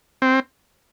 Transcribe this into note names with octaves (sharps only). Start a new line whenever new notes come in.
C4